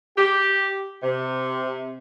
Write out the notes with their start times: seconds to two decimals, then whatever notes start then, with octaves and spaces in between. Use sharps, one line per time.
0.16 G4
1.02 C3